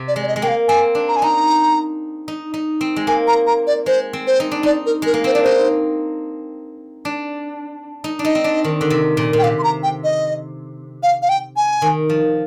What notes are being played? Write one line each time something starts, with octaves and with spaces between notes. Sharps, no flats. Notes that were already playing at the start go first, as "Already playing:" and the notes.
Already playing: C3
D5
G#3
D5
D#5
G#3
A#3 G5
F5
C4 G#5
D4
A#5
G#5
D#4 A#5
D#4
D#4
C4
G#3
A#3 G#5
A#5
A#5
D5
G#3 C5
C4
C5
D#4
D4
D#4 D5
A#4
G#3 A#4
A#3
C4 C5
D4 D5
D#4 C5
D4
D#4
D4
D#4 D#5
C4
D4
D#3
D3
C3
A#2
A#2
G5
C3 F5
C6
A#5
G5
D#5
F5
F5
G5
G#5
D#3
F3